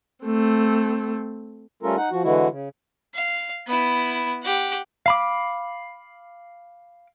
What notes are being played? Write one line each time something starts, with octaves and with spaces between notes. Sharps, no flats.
A3 C4
G3 A3 C#4 F4 A4 A#4
D#4 F#5
F3 F#4
D3 E3 G#3 E4 F#4
C#3
F5
B3 E4
G4 F#5
F5 B5 D6